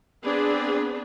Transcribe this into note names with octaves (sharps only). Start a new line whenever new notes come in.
B3 C4 D4 G#4 B4